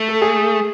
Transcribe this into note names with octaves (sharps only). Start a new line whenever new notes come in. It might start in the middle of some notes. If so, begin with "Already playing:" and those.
Already playing: A3
A4
G#4